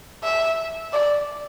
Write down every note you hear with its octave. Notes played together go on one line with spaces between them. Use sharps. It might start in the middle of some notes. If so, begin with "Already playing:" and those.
E5
D5